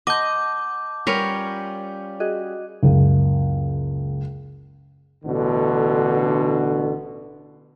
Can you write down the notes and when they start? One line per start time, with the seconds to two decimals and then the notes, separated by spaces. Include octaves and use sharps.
0.07 D#5 F#5 A5 C6 D6 G6
1.07 G3 C#4 F4 A#4 B4 C#5
2.20 F#4 G#4 D#5
2.83 F#1 C#2
5.25 A1 B2 D3